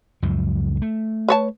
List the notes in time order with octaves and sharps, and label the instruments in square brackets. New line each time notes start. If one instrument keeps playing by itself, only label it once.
[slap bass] C#2 F#2 F3
A3
[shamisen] B4 C#5 A5